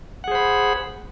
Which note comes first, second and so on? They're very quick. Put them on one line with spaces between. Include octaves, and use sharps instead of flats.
F#5 G#4 C5 B5